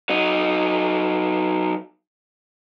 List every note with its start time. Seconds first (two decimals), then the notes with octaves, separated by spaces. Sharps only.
0.10 F#3 D#4